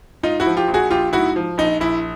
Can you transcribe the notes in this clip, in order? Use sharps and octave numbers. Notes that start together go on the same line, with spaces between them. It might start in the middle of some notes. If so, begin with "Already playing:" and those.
G#2 D#4 F4
E4 F#4
F3
F4 G4
A#1
F#4 G#4
A#1 F4 G4
G#2 E4 F#4
F3
A#1 D#4
A#1 E4